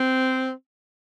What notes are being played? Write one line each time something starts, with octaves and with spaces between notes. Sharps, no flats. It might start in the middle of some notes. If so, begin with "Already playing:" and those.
Already playing: C4